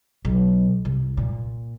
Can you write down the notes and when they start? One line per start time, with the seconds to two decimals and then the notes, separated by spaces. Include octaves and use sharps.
0.25 B1
0.85 C2
1.17 A#2